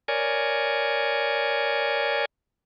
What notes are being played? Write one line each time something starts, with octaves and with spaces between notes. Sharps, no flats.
A#4 C#5 D5 G#5